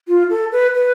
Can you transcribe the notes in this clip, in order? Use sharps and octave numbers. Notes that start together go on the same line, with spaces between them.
F4
A4
B4
B4